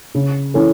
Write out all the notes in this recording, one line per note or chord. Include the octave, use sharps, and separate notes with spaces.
C#3
E3 C#4 A4